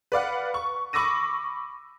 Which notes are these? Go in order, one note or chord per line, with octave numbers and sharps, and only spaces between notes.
B4 D5 F5 F#5
C#6
B5 C#6 D6 E6 A#6 D#7